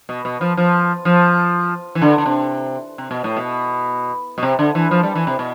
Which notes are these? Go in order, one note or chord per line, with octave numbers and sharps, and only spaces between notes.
B2
B2
F3
F3
F3
E3
D3
D3
C3
C3
B2
A2
B2
B2
C3
D3
E3
F3
G3
E3
C3
B2